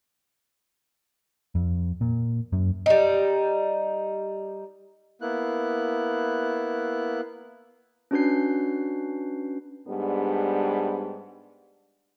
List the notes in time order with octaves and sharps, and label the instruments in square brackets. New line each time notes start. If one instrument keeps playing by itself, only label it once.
[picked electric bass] F2
A#2
F#2
[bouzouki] G3 D#4
[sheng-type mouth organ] A#3 B3 E4 F#6
[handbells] C#4 D4 F#4 B4 G6 C7
[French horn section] G#2 G3 B3 D4